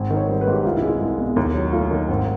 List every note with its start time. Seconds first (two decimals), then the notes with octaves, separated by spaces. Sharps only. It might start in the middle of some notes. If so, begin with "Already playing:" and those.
Already playing: G#1
0.10 D#3
0.17 C#5
0.28 G3 C5
0.41 B4
0.47 G#2
0.53 G4
0.65 C2 F4
0.77 E4
0.82 G#3
0.89 E4
1.01 C2
1.19 B2
1.36 D#2
1.54 F#3
1.72 A3 F4
1.91 D#3
2.09 G#1